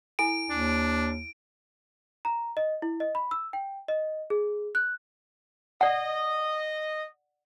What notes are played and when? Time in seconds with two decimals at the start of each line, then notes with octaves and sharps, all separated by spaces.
0.19 E4 A4 G#5 D7
0.50 D#2 D4
2.25 A#5
2.57 D#5
2.82 E4
3.00 D#5
3.15 B5
3.31 E6
3.53 G5
3.88 D#5
4.30 G#4
4.75 F#6
5.81 D5 D#5 F#5